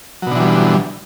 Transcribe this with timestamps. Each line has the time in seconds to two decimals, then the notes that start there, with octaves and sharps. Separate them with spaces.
0.22 F#3
0.27 B2
0.31 D3
0.36 E3
0.40 G3